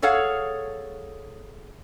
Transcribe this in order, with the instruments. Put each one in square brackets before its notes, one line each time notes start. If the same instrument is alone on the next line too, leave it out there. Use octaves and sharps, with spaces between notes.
[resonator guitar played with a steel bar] G#4 A4 C#5 F5 F#5